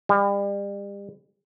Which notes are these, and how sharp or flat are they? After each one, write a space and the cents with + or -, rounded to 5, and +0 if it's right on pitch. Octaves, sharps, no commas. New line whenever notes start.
G3 +35